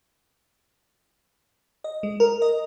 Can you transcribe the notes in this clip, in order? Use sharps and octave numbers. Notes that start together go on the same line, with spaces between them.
D#5
G#3
A#4
D#5